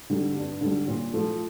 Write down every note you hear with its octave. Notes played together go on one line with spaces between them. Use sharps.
D3 G3
G2
D3 G3
A#2
F3 A3